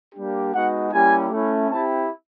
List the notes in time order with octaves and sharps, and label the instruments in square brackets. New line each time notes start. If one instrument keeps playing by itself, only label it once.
[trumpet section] G3 A#3 D4 G4
G#3 B3 D#4 F#4 F#5
G3 A#3 C#4 E4 G4 G#5
A3 C#4 E4
C4 E4 G4 A5